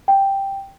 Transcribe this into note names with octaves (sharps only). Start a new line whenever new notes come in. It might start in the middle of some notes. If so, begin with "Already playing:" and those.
G5